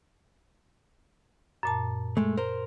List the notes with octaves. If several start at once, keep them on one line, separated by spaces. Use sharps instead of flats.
F#2 A#2 A5
G#3 A3
A#4 C5